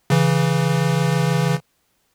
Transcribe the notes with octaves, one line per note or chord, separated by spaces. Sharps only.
C#3 E3